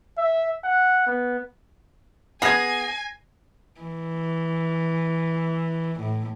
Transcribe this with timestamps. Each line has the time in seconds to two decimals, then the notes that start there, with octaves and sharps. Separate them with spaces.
0.18 E5
0.64 F#5
1.07 B3
2.42 B3 G#4 G#5 G#6 A#6 C7
3.81 E3
6.00 A2